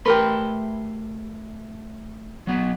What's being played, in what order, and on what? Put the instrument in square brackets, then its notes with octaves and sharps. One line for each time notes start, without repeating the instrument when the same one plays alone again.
[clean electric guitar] A3 B5 C6 [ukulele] G4 A#4 B4
[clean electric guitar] F#3 B3